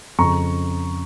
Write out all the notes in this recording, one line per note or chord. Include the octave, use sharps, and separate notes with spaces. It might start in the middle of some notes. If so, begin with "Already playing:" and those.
F2 C#3 A#5 C#6